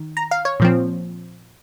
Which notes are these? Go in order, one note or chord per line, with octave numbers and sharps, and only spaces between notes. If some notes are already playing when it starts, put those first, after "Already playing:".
Already playing: D#3
A#5
F5
C#5
A#2 F3 C4